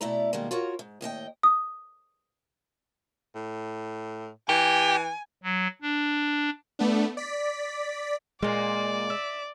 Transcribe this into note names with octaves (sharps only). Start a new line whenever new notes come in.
B2 A3 E4 D5 A#5
B2 D#3 G3 G#3 A#3
F4 F#4 A#4 C#5
G#2
D#2 A2 D#5 G5
D#6
A2
E3 G4 G#5
F#3
D4
A3 B3 D4
D5 B6
A#2 G#3 A#3 D5
E5